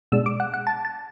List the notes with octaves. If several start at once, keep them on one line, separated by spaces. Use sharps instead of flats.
B2 G#3 D4 E6
D6
F#5
F#5
A5
A5